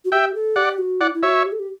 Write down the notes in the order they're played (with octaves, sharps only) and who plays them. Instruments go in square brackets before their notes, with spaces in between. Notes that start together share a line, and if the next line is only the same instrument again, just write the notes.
[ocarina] F#4
[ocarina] G4 [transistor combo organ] E5 G5
[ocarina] A4
[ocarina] G4 [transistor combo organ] D5 F#5
[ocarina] F#4
[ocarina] E4 [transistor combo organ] D5 F#5
[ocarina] E4
[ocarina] F#4 [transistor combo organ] C#5 E5
[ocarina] G4
A4
G4